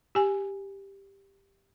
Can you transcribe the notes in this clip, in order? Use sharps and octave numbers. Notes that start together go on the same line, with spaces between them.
G4 G#5